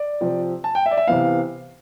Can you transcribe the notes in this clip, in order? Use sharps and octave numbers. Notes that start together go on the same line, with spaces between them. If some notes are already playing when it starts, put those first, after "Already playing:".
Already playing: D5
C3 F3 C4
A5
G5
E5
D5
E5
C3 E3 B3 F5